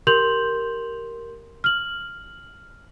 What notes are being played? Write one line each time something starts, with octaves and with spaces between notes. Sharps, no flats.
G4 A#4 C6 G6 F7 F#7
F6 F#7